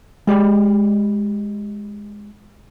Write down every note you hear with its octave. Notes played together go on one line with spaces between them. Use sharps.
G#3 G4 D5 B5